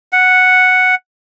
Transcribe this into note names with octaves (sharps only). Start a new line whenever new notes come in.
F#5